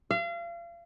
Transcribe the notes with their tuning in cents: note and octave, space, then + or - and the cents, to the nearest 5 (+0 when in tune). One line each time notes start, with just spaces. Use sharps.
F5 -35